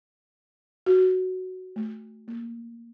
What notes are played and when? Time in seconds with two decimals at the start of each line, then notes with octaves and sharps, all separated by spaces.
0.86 F#4
1.76 A3
2.28 A#3